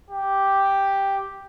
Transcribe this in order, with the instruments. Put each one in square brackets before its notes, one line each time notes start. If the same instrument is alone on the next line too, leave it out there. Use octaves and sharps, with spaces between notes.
[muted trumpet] G4